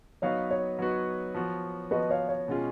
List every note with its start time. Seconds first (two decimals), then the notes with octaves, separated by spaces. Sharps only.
0.22 F#3 B3 D#4 F#4 B4 C#5 F5
0.51 C#5
0.79 F#3 B3 D#4 F#4 B4
1.35 F3 B3 F#4
1.91 F3 B3 F#4 B4 D#5
2.10 C#5 F5
2.28 C#5
2.48 B2 G#3 C#4 F4 G#4